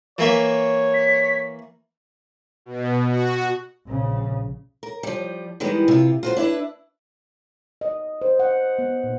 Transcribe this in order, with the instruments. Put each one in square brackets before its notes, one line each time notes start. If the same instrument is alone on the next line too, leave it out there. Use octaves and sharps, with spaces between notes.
[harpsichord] E3 A#3 E5 [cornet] C#5
[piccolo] B6
[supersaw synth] B2
F#4
[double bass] A#1 C#3
[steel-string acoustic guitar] A#4
F3 G3
D#3 E3 G3 G#3 B3
C3 F4
F4 F#4 C5
D4 E4 B4
[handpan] D#5
C5
F#5
B3
A#2